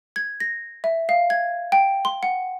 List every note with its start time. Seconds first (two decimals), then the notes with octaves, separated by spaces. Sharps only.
0.16 G#6
0.40 A#6
0.84 E5
1.09 F5
1.30 G#6
1.72 G5
2.05 C6
2.23 F#5